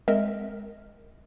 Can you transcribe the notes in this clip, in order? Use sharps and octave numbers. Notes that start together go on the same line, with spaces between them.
G#3 C4 A#4 D#5 E5